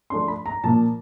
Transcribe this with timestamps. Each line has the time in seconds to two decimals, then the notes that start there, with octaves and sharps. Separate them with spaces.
0.10 F3 A3 D4 C6
0.28 B5
0.46 A#5
0.64 A#2 F3 A#3 A5